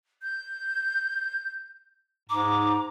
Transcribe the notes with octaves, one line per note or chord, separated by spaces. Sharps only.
G6
G#2 A#5 D6